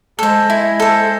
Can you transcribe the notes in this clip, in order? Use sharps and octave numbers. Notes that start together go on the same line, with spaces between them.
G#3 A4 C5
E4
A4 C5